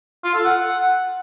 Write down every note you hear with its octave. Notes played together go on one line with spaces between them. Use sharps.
F4
A4
F#5